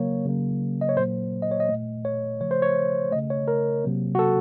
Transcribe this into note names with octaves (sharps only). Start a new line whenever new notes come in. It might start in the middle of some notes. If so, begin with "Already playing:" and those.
Already playing: C#3 F#3 A#3 C#5
C#3 F#3 A#3
D#5
C#5
A#2 F#3 A#3 C5
D#5
C#5
D#5
A#2 A3
C#5
C#3 F3 A3 C#5
C5
C#5
C#3 A3 D#5
C#5
A#4
C3 F#3 A#3
F#4
A4